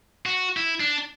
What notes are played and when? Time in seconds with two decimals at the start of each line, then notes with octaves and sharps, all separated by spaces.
0.26 F#4
0.57 E4
0.80 D4